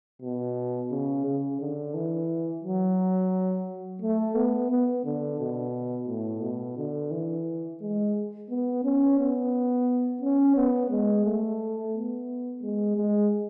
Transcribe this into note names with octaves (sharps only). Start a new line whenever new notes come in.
B2
C#3
C#3
D3
E3
F#3
A3
B3
B3
D3
B2
A2
B2
D3
E3
G#3
B3
C#4
B3
C#4
B3
G#3
A3
B3
G#3
G#3